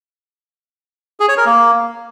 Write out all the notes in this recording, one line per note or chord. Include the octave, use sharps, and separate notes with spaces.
G#4
C#5
A#4
A#3